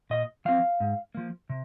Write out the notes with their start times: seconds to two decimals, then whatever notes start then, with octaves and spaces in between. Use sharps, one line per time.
0.10 A#2 D#5
0.45 F3 C4 F5
0.80 G#2
1.15 F3 A#3
1.49 C3